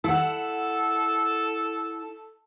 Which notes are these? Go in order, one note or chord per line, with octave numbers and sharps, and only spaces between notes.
E4 A4 F#5